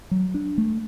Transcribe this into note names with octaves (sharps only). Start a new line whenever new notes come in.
F#3
D4
A3